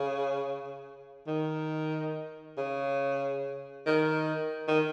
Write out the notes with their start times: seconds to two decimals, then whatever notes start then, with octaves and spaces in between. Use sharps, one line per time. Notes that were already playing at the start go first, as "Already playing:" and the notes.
Already playing: C#3
1.27 D#3
2.57 C#3
3.86 D#3
4.68 D#3